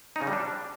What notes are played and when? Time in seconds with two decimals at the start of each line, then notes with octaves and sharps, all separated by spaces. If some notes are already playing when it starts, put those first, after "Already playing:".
0.16 D#4
0.21 C#3
0.27 G3
0.33 D4